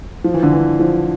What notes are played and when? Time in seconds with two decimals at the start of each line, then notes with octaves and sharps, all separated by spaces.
0.24 F3
0.34 E3
0.43 D3
0.52 E3
0.80 F3